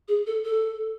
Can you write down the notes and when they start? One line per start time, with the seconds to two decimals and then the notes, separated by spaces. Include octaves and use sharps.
0.08 G#4
0.27 A4
0.45 A4